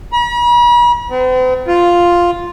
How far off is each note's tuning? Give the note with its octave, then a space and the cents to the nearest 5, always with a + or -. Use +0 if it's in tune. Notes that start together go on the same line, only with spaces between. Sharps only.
B5 -45
C4 -45
F4 +0